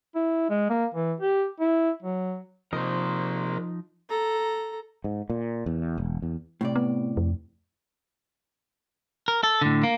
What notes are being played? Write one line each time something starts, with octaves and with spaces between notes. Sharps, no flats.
E4
G#3
A#3
E3
G4
E4
F#3
C3 F3 A#3 D#4 A#4 C5 D#5
A4 A#5
G#2
A#2
E2
E1
E2
A2 C3 D5
B3
F2
A#4
A4
A2 D3
A#3